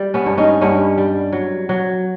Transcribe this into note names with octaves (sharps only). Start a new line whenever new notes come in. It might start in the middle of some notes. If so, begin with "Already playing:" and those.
Already playing: G3
B3 C#4
G2
C#4 D#4
G2 B3 C#4
G3
F#3
F#3